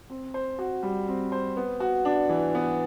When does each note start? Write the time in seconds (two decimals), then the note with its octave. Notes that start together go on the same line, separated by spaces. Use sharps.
0.10 C4
0.34 C5
0.59 F#4
0.83 G3
1.08 C4
1.32 C5
1.57 B3
1.80 F#4
2.05 D4
2.29 E3
2.55 B3